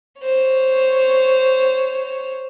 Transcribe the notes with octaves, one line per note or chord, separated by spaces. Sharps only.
C5 C#5